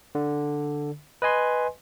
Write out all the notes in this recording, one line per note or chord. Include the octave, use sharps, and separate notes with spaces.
D3
B4 D#5 G#5 C6